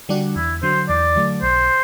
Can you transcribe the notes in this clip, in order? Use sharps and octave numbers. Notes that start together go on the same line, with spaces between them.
D3 G3 D4 F#4
E2 E4
D3 F#3 C5
E2 D5
D3 F#3 A3
B1 C5